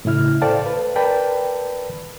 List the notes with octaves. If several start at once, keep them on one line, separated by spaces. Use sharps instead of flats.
A2 C#3 E4 F6
A4 C5 D5 F5 G5 A5
B4
A#4 B4 D5 G5 A5 B5